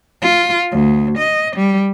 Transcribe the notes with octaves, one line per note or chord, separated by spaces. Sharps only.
F4
D2
D#5
G3